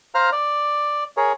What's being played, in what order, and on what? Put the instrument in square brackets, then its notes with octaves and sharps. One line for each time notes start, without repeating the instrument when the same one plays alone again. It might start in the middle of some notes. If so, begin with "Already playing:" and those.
[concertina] C5 F5 A#5 F6
D5
G#4 A#4 C#5